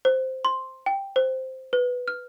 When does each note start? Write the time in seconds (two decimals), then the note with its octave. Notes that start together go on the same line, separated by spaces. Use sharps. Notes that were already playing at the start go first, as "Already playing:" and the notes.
0.05 C5
0.45 C6
0.86 G5
1.16 C5
1.73 B4
2.08 F6